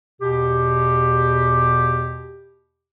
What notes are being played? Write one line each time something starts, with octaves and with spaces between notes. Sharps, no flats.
E2 B2 G4